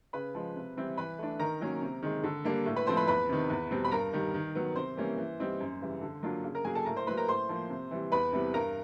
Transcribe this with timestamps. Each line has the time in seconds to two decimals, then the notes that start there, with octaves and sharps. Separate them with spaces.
0.13 C#3 B4 B5
0.35 F3 G#3
0.56 C3
0.77 E3 G3 C4 E4
0.97 E3 B4 B5
1.19 A3 D4
1.39 D#3 A#4 A#5
1.61 F#3 A#3 C#4
1.82 C3
2.03 D#3 G#3
2.24 D3
2.44 G3 A#3 D4
2.65 A2
2.76 B4 B5
2.87 F3 A3 C4 C5 C6
2.97 B4 B5
3.07 E2 B4 B5
3.29 C3 D#3
3.50 E2
3.71 B2 G3 C4
3.84 B5
3.92 G2 A#4 A#5
4.13 D#3 G3
4.34 D#3
4.55 F#3 B3
4.75 C3 C5 C6
4.97 E3 G3 A#3 C#4
5.18 E3
5.39 G3 C4 D#4
5.60 F#2
5.81 C#3 E3 G3
6.02 D3
6.23 F#3 A#3 D4 F4
6.44 C#3
6.55 A#4 A#5
6.65 F#3 A#3 G#4 G#5
6.75 A4 A5
6.86 A2 A#4 A#5
6.96 C5 C6
7.07 F#3 A#3 B4 B5
7.18 A#4 A#5
7.28 A2 C5 C6
7.49 F3 A#3
7.70 C3
7.91 E3 G3
8.12 E2 B4 B5
8.33 C3 E3 G3 B3
8.54 G2 A#4 A#5